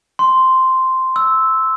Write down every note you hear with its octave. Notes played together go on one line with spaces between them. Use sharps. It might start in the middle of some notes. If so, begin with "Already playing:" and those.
C6
E6